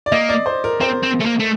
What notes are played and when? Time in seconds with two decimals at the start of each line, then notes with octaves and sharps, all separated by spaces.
0.06 D5
0.12 A#3 D#5
0.29 D5
0.46 C5
0.64 A#4
0.81 C4 C5
1.03 C4
1.20 A3
1.26 A#3
1.40 A3